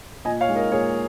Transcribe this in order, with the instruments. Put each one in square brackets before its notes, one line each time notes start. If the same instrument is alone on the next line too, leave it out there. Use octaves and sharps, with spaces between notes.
[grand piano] A#2 D#5 G#5
C#5 F5
G#3 D#4
A#4 D#5
A#2 G#4 C#5